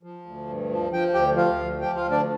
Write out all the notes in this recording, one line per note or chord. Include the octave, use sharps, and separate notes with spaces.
F3
D2
G2
F3
F3 G5
D2 G4 G5
F3 F4 F5
D2
F3 G4 G5
F4 F5
D2
D4 D5